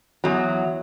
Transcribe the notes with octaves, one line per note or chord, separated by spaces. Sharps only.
E2 F#3